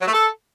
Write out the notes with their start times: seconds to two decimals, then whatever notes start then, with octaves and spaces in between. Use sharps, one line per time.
0.01 F#3
0.07 A3
0.14 A4